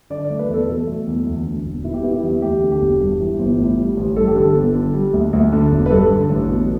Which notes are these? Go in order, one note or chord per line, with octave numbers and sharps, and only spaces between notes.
D3 D5
D5
A3
B4
E2
A4
B2 A4
A3
E2
D2
D3
E1
B2 E4
G4
B3 E4
G4
E2 E4
D2 G4
D3
G4
E1
G2
E3
G1
A2
G3
A1
G2 A4
G4
D3 A4
G1
D3
G3
D2
D2
D3
E1
B4
G2 A4
D3
A1
B2